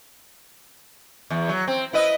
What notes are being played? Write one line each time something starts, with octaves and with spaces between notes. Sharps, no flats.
E2
F#3
C4
E4 B4 D#5